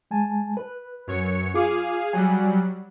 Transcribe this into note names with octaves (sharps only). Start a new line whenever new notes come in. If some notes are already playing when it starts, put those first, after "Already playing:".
G#3 G#5 A5
B4
F#2 C#5 C#7
F4 G#4 F5 D6
F#3 G3 G#5